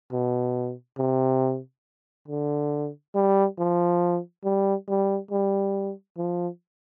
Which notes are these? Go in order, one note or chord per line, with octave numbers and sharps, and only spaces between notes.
B2
C3
D3
G3
F3
G3
G3
G3
F3